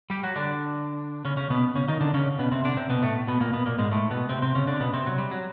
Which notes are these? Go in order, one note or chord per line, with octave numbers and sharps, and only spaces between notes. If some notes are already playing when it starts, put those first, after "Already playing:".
G3 G4
F#3 F#4
D3 D4
C#3 C#4
C#3 C#4
B2 B3
C#3 C#4
D#3 D#4
D3 D4
C#3 C#4
B2 B3
C3 C4
D3 D4
C3 C4
B2 B3
A2 A3
B2 B3
A#2 A#3
B2 B3
A#2 A#3
G#2 G#3
A2 A3
B2 B3
C3 C4
C3 C4
C#3 C#4
D3 D4
B2 B3
C3 C4
F#3
G3
F#3